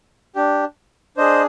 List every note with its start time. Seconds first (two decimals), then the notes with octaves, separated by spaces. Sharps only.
0.35 D4 G4
1.17 D4 G#4 C5 D#5